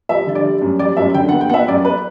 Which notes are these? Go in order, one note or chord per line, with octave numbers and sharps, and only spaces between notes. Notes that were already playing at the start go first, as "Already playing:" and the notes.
G3 E5
D3
D5
G3
F#2
G3 D5
F#2 E5
D3 G5
B3 F#5
G5
B3 E5 F#5
F#2 D5
B4